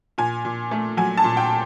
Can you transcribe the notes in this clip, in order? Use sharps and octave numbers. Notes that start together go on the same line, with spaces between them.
A#2 G#5
A#2
A3
F#3 G#5
A5
A#2
G5